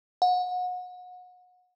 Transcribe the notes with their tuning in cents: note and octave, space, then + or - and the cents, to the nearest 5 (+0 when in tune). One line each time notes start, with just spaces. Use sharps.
F#5 -30